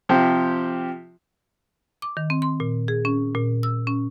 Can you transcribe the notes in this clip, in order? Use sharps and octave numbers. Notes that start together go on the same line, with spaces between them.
C3 F3 G4
D6
D#3
C4
C6
A#2
G#4
C#4
A#2
E6
C#4